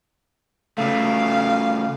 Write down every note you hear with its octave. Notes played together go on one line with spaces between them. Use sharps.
C#3 A3 F5